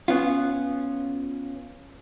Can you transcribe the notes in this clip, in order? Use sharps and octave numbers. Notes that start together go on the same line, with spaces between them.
B3 C#4 F4